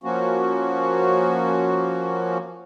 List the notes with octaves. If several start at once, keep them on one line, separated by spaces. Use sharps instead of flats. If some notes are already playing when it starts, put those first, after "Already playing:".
F3 A#3 C#4 F#4